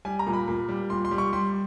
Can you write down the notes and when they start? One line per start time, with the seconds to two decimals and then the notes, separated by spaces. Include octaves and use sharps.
0.05 G3 G#5
0.19 A#5
0.27 A#2
0.33 B5
0.48 A#2
0.69 G3
0.90 A#2 C6
1.05 C6
1.11 G3
1.18 C#6
1.33 G3 C6